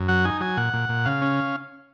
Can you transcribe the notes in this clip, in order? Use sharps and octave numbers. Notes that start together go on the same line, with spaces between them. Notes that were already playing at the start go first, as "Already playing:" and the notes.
Already playing: F#2
F#3 F#5
D#4 G#5
F#3 G#5
A#2 F#5
A#2
A#2
C#3 F5
C#4